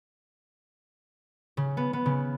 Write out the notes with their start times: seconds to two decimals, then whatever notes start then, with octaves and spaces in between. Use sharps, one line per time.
1.57 C#3
1.77 B3
1.93 B3
2.06 C#3